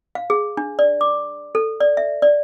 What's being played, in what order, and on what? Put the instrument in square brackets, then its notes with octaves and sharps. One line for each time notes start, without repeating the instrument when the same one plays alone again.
[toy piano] F5
G#4
D4
D5
D6
A4
D5
E5
D5